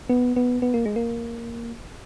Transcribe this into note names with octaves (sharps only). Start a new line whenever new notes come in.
B3
B3
B3
A#3
G#3
A#3